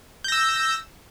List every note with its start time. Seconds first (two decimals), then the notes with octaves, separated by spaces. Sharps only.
0.24 G6
0.28 A#6
0.32 E6